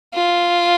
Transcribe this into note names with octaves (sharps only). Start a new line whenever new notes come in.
F4